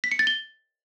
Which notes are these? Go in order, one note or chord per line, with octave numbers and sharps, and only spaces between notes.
B6
C#7
A6
G7